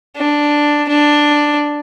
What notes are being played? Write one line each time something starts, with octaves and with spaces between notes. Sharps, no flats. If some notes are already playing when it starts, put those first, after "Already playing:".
D4
D4